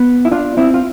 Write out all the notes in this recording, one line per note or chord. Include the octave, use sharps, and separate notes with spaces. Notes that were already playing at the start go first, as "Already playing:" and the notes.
Already playing: B3
E4
D4 F4
C4 E4
F4